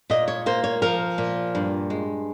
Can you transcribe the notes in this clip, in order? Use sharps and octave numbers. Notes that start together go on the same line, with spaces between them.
A#2 D#5
C#5
A#3 C5
C#5
F3 A#4
A#2
G2
G#3